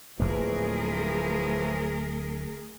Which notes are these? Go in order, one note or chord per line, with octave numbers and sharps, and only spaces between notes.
D1 D#2 E3 F3 A3 A#3 G#4 A#4